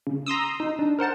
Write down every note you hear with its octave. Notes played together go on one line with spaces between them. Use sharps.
C#3
A#5 C6 D#6 E6
D#4
D4
A#4 C5 F#5 A5